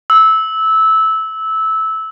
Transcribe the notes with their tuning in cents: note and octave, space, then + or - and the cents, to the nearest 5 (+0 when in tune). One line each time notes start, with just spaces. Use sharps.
E6 -15